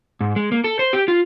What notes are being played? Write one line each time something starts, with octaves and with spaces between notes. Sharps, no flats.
G#2
G#3
A#3
A4
C5
G4
F4